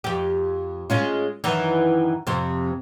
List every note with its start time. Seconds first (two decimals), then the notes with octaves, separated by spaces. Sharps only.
0.04 F2 G4
0.90 G#3 C#4 F4
1.44 F#2 D#3 E3
2.27 F2 C3 C4